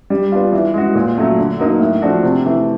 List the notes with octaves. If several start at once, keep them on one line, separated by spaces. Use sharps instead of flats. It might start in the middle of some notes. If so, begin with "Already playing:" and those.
G3
B3 D4 F4
E3
G#3 C#4 F#4
A#2
F#3 A3 C#4
D3
F#3 A#3 D#4
A2
F3 A3 D4 F#4
C3
E3 A3